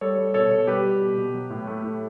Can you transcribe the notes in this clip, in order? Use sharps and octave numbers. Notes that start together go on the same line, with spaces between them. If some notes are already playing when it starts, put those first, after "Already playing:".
G3 A4 C#5
G3
B2 A4 C#5
B2
G3 G4 B4
G3
B2
B2
F#3
A2
A3
A2